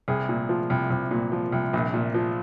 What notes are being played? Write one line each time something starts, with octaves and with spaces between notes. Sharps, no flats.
C2 G#4
A#2
F3
C2
C2
A#2
F3
C2
A#1
A#2
F3